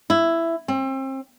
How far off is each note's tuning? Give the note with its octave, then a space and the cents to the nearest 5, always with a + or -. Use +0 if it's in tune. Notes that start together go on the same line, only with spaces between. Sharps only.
E4 +10
C4 +35